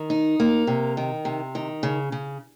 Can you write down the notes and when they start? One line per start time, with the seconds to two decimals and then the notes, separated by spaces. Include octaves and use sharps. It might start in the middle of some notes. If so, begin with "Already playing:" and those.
Already playing: D#3
0.10 D#4
0.40 A#3
0.67 C3
0.97 D#3
1.25 C3
1.55 D#3
1.83 C#3
2.12 C#3